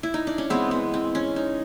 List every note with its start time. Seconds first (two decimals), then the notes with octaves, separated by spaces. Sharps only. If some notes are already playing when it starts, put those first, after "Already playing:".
0.03 E4
0.14 D#4
0.27 D4
0.38 C#4
0.50 E3 G#3 B3 C4
0.71 B3
0.94 C4
1.15 C#4
1.36 D#4